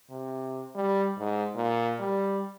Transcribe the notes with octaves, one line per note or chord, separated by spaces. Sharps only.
C3
G3
G#2
A#2
G3